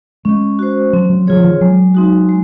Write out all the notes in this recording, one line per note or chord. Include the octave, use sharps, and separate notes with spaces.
G#3 C#4
F#4 C5
F#3 C4
F#3
F#3 F4 G#4 C#5
F3
D#3
F#3 G#3
C4 D#4 F#4
G#3